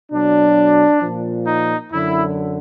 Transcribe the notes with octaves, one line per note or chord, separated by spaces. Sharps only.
B2 F#3 D4
A#2 F3
D#4
F#2 D3 F#3 E4